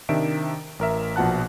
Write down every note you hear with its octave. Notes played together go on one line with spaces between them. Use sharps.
C3 D#3 D4 E5 D7
A1 A#4 E5
A#1 B2 F3 F#5 A5 F#6